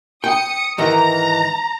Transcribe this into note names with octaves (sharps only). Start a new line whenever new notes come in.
G5 D#6 C#7
G#2 D#3 E3 A#5